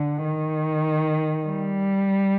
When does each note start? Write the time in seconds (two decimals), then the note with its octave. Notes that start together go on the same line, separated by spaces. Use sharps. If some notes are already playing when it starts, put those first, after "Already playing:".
Already playing: D3
0.24 D#3
1.45 G3